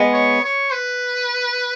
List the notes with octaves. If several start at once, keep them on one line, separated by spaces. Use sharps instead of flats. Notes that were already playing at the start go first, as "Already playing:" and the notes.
Already playing: G#3 B3
C#5
C#5
B4